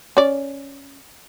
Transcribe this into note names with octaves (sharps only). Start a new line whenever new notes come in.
C#4 D5